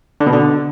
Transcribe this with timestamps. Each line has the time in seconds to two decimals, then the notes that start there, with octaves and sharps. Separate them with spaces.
0.20 D3
0.26 B2
0.32 D3